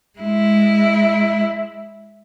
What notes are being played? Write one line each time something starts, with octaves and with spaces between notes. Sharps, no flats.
G#3 E4